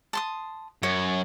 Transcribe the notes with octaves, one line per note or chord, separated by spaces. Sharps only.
A5 C6 D#6
F#2 C#5